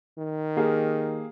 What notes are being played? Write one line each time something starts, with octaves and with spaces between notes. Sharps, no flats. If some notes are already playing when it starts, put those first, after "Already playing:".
D#3
A#3 G4 G#4